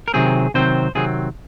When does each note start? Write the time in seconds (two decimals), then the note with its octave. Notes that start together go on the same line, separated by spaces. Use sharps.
0.08 A#4
0.14 C3 D#3 F#3 C4 G#4
0.54 C3 D#3 F#3 C4 C5
0.95 C3 D#3 F#3 C4 G#4